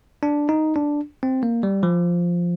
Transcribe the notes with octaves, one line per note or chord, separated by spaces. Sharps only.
D4
D#4
D4
C4
A#3
G3
F3